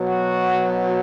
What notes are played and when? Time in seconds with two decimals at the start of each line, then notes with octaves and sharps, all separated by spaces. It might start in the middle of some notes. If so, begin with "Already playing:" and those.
Already playing: B2 F#3
0.09 F#4